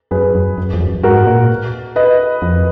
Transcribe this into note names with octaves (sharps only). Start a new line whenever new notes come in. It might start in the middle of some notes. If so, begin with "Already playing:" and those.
F#2 G#4 B4
F#2
F#2
F2
F#2
G#2 F#4 A#4
A#2
B4 D#5
F2